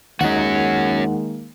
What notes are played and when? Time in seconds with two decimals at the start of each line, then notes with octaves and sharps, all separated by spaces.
0.21 D#2 D#3 G#3 A#3 C#4 D#4 F#4 F#5